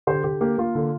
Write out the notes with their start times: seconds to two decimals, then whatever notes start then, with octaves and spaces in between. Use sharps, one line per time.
0.07 D3 G4 C5
0.24 D3 G4
0.41 A#3 G4
0.58 A#3 F4
0.75 D3